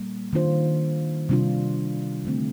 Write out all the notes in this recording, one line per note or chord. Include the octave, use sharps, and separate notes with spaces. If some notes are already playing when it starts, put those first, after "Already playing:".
Already playing: A#2 G3 A#3
D#3 A#3 D4 F4 C5
C3 G3 D4 F4
D3 A3 C4